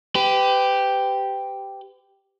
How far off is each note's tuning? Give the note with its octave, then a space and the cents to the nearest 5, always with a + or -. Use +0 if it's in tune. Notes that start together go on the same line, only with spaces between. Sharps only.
G4 +0 B4 +40